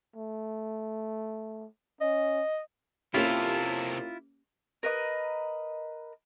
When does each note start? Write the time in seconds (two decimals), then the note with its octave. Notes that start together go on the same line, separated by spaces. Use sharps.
0.16 A3
2.01 C#4 D#5
3.14 C3 A#3 C#4 E4 F4 G4 A4
4.83 A#4 B4 D#5